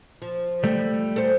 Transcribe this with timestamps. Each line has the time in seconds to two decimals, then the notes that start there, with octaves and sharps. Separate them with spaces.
0.22 F3
0.64 G3 A3
1.16 A4 C5